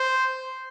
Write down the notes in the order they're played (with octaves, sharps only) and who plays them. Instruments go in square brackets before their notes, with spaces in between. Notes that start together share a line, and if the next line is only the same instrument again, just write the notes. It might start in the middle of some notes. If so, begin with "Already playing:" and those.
Already playing: [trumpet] C5